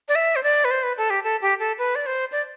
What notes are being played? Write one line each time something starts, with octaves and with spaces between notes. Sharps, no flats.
D5
E5
C5
D5
B4
C5
B4
A4
G4
A4
G4
A4
B4
D5
C5
D5